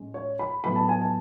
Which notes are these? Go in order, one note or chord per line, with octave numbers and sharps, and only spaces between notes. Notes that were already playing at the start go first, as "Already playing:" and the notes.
Already playing: A2 G#3 C#4
C#5
B5
A2 F#3 B3 B5
A5
G#5
A5